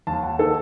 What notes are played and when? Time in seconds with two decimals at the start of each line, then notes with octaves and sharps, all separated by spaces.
0.07 D#2 A5
0.23 F#5
0.39 D#3 A4